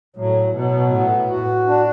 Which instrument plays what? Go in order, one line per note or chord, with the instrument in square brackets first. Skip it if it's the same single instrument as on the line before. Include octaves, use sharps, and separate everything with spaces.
[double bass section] A2 [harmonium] F#3
[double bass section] B2 [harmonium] F#3
[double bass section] A2 [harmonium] B3
[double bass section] A2 [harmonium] F#4
[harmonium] D4